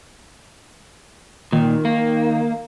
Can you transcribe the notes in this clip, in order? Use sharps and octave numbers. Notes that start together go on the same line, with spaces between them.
A#2 D#3
A#3